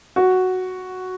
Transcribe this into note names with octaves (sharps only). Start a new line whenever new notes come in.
F#4